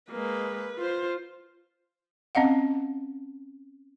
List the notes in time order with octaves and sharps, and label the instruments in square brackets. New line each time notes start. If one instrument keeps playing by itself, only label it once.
[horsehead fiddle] G#3 A#3 [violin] B4
[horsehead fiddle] F4 C5
[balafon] C4 C#4 D#5 F5 F#5